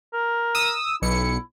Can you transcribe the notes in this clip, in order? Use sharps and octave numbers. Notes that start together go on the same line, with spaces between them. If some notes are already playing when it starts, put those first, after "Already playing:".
A#4
D#6 E6
B1 E4 C#7